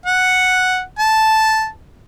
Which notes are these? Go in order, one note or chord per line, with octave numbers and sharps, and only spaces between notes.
F#5
A5